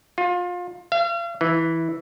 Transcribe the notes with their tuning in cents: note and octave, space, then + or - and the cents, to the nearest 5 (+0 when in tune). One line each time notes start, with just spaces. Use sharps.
F4 +25
F5 -40
E3 -10